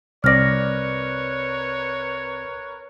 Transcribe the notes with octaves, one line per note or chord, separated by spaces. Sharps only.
C2 C4 A#4 B4 C#5 D5 F6 A#6